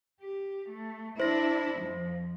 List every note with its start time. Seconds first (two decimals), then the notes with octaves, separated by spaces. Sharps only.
0.21 G4
0.69 A3
1.20 D4 E4 C5 A#6
1.79 F2 F3